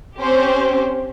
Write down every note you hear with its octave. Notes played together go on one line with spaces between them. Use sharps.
C4 C#4 G4 C5